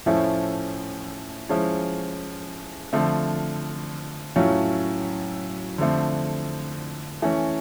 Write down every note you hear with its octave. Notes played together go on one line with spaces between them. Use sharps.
A2 F3 A3 C#4 E4
F3 G#3 C#4 E4
D3 F3 A3 C4
A2 F#3 A3 C#4 F4
D3 F3 A3 C4
E3 A3 C#4